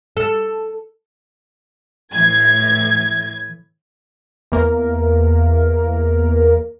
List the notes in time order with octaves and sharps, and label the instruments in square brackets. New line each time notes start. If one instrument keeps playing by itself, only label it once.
[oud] A4
[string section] A2 E3 G#6
[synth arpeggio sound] E2 A#3 A#4